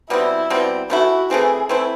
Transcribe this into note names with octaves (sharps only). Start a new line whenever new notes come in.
B2 G3 C4 E4
B2 G3 C4
E3 A3 C4 E4 F#4
E3 A3 C4 E4 G#4
E3 A3 C4 E4